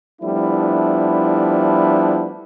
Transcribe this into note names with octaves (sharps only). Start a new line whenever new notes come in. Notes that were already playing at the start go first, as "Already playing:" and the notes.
F3 G3 A3 B3 D4 E4